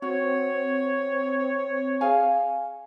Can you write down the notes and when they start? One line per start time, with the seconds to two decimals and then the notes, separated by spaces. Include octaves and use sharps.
0.02 C4 F#4 C#5
2.01 G#4 F5 G#5